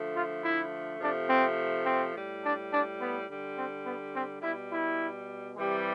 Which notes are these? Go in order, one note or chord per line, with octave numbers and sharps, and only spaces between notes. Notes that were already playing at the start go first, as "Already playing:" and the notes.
Already playing: D3 F3 A3
F4
E4
C3 F3 A3 D4
C4
C4
A2 G3
D4
D4
B3
D3 G3
C4
B3
C4
B2 G3 E4
E4
C3 E3 G3